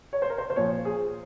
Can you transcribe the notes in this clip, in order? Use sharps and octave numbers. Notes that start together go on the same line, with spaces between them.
C#5
C5
A#4
C5
C5
A#2 F3 C#5
G#4